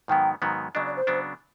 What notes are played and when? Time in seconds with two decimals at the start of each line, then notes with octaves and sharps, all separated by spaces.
0.08 G#2 D#3 F#3 B3 G5
0.42 G#2 D#3 F#3 B3
0.74 C#3 F#3 B3 D4 D#5
0.86 D5
0.96 C5
1.07 C#3 F#3 B3 D4